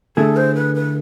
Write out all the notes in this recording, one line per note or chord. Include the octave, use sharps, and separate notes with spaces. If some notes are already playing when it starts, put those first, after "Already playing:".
D3 A3 E4 G#4 A4
C5
B4
B4